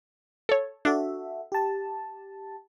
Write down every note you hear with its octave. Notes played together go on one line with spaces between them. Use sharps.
A4 C#5
D4 F#4 A4 E5
G4 A5